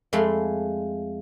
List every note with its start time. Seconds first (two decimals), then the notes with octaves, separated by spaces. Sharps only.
0.13 F2 G#3 A3 B5 C6